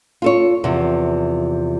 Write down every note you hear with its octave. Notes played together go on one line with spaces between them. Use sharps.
F4 A4 C#5
E2 C3 F3